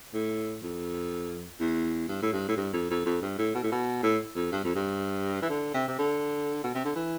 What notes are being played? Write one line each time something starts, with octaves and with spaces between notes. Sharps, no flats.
A2
F2
E2
G2
A2
G2
A2
G2
F2
F2
F2
G2
A2
B2
A2
B2
A2
F2
G2
F2
G2
E3
D3
C3
C3
D3
B2
C3
D3
E3